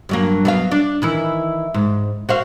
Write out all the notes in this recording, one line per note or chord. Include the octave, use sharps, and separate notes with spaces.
G2 F#3 A#3
F#3 B3 F5
D4
D#3 E3 E4
G#2
F#4 C5 F5